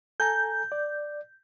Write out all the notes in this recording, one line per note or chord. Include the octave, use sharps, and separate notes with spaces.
A4 G#5 A#5 G6
D5